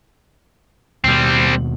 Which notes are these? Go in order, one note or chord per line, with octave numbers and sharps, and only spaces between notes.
D#2 B2 G3 C4